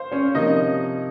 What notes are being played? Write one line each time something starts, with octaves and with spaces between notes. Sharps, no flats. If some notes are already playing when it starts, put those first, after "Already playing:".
Already playing: C5 F5
C#4 C#5
C3 F3 A#3 C#4 D#4 D#5